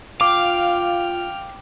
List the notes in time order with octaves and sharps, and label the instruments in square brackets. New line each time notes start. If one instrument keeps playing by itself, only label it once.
[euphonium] F4 [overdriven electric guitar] F5 [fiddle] G5 F6 [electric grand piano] D6